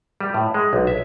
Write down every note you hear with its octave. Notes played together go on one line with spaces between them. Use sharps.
G3
A2
G#3
B1
E5